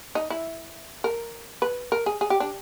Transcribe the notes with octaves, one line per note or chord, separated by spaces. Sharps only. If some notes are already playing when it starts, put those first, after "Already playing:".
D#4
E4
A#4
B4
A#4
G#4
G#4
G4
D4